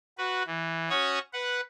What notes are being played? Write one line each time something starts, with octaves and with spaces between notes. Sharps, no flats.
F#4 B4
E3
C#4 F#4 C#5 C#6 D#6
B4 F#5